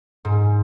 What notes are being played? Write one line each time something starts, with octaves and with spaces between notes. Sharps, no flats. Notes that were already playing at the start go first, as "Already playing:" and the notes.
G#2